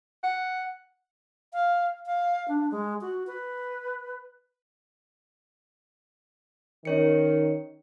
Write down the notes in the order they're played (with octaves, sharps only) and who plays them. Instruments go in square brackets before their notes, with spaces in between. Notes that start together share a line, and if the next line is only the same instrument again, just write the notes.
[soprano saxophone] F#5
[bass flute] F5
F5
D4
G#3
F#4
B4
[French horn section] D#3 [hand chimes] C#4 C#5 C#7